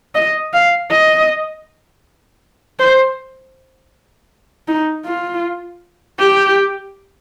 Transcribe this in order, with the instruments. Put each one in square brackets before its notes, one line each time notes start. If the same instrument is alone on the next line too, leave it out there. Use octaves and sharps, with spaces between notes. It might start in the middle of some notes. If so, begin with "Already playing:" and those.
[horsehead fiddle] D#5
F5
D#5
C5
D#4
F4
G4